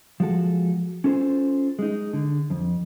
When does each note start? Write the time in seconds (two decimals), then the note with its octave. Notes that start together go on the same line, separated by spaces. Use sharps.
0.20 F3 G#3 F#4 A4
1.04 C#4 F4 A4 B4 C5
1.79 G#3 D#4
2.13 D3
2.50 F2